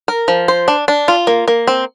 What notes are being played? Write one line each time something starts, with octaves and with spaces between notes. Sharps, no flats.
A#4
F3
C5
D4
D4
F4
A#3
A#3
C4